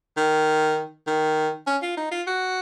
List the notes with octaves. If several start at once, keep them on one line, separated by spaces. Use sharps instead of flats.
D#3
D#3
C#4
F4
D#4
F4
F#4